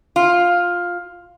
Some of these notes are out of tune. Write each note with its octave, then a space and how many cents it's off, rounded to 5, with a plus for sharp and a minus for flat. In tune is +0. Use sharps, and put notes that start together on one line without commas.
F4 +10